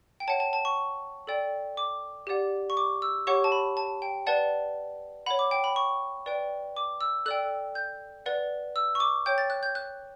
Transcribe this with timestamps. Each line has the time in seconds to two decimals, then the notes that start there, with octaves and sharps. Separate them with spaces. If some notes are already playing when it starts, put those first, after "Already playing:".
0.20 G5
0.28 C#5 F#5 A5
0.40 A5
0.53 A5
0.65 C#6
1.27 A4 D5 G5
1.77 D6
2.27 G4 D5 F#5
2.70 C#6
2.77 D6
3.02 E6
3.27 G4 C#5 F#5 C#6
3.44 A5
3.52 B5
3.77 A5
4.02 G5
4.27 B4 D5 F#5 A5
5.26 C#5 F#5 B5
5.39 D6
5.51 G5
5.64 B5
5.76 C#6
6.26 B4 D5 G5
6.77 D6
7.01 E6
7.26 A4 D5 G5 F#6
7.75 G6
8.26 B4 D5 F#5
8.76 E6
8.95 C#6
9.00 D6
9.26 C#5 G5 G6
9.38 A6
9.50 F#6
9.63 G6
9.75 F#6